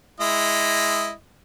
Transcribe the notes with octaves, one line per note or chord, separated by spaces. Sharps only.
G#3 E4 D#5